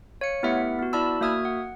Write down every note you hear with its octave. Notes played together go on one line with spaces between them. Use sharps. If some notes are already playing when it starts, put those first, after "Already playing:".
C#5 F5 C#7
A3 B3 E4 G4 E5 F#5
B3 F#4
E4 D5 A5 B5 E6
A#3 F#4 E5 D#6 F6 G#6
F#5